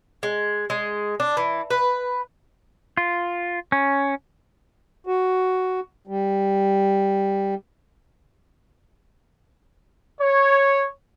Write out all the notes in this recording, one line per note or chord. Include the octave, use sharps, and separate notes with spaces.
G#3
G#3
D4
E3
B4
F4
C#4
F#4
G3
C#5